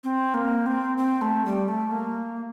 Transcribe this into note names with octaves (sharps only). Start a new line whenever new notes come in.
C4
A#3
C4
C4
A3
G3
A3
A#3